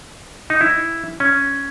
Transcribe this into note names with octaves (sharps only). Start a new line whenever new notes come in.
D#4
E4
C#4